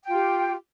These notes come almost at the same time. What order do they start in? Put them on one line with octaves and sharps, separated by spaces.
G5 F4 G4